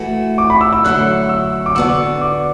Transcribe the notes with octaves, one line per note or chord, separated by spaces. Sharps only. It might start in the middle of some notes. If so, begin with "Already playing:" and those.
Already playing: E3 A3 F#4
D6
B5
E6
E6
D3 F#3 A3 E4 F#6
E6
D6
D3 B3 D4 F#4 E6
D6